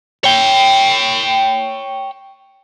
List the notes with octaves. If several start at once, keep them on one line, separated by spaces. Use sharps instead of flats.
C#5 G5